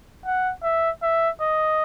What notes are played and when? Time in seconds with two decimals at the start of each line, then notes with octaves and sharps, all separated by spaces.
0.25 F#5
0.63 E5
1.03 E5
1.41 D#5